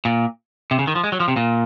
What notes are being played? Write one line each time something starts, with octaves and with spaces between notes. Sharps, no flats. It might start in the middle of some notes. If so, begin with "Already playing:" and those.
A#2
C3
C#3
D#3
F3
G#3
F#3
F3
C3
A#2